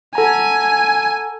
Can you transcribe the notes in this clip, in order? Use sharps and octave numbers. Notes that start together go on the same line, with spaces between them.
A4 F#5 G#5 A#5